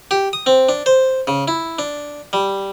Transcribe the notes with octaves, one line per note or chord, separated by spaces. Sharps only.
G4
D#6
C4
D4
C5
C#3
E4
D4
G3